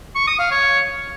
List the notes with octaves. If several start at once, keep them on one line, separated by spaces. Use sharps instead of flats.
C#6
D#6
F5
C#5